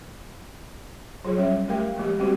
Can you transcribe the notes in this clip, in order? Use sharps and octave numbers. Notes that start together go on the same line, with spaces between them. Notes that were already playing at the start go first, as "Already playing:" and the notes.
F#3 F4 G#4 C#5
G3 C#4 E5
A3 G4 A#4 F5 G5
F3 G#3 A#3 G4
G3 C4 F#4 G4 C5